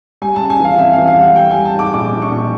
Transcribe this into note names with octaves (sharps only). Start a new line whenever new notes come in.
G3 G#5
C#3 A5
G#5
E3 F5
F2 E5
F5
E3
F5
G3 F#5
G3 G5
G3 G#5
A5
G#2 D6
A#1 D6
A#1
C#6
A#1